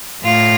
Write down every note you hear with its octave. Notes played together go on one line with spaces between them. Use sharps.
A2 F4